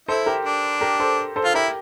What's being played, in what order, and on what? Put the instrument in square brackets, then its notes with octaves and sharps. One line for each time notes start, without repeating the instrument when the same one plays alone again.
[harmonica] E4 [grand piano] A4 C5
[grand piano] G4 A#4
[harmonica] D4
[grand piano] G4 A#4
A4 C5
A4 C5
[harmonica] F4
[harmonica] E4 [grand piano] G4 A#4